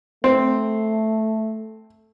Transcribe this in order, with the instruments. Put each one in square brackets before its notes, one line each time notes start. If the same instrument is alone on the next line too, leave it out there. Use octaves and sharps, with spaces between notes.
[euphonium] A3 [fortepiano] C4